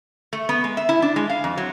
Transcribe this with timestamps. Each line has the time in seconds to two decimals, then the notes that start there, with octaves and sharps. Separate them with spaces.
0.33 A3
0.49 B3
0.64 G#3
0.77 E5
0.89 E4
1.02 D4
1.16 G#3
1.30 F5
1.44 F2
1.58 F#3